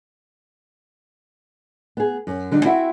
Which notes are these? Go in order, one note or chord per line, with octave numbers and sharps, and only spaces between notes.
B3 G#4
F#2
D3 F#3 G3 D4 D#4
C4 E4 F#4 E5 F#5